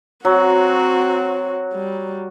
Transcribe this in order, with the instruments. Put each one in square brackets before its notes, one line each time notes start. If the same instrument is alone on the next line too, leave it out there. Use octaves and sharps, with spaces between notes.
[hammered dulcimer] F#3 [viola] C4 F#4
[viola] G3